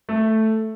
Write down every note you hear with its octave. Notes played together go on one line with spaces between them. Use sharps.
A3